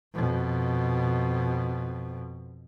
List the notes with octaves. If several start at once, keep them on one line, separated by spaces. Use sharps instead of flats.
F2 B2